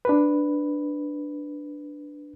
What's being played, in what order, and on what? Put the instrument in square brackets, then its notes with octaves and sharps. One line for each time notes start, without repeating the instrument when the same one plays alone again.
[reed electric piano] D4 B4